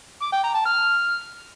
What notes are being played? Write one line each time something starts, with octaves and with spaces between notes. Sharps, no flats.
D6
G5
A#5
A5
F6